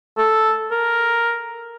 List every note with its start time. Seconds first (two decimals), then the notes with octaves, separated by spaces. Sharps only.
0.18 A4
0.71 A#4